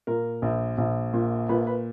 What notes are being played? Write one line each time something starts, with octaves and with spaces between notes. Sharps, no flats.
A#2 A#4
A#1
A#1
A#2
A#2 B4
B4